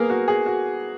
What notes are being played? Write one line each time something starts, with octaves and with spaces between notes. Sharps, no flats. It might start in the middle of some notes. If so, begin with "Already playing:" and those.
Already playing: A#3 B3 G#4 A#4
F#4
G#4
F#4